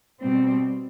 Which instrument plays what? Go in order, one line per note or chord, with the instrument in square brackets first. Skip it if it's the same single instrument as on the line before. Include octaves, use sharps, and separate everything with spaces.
[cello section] B2 G3 C4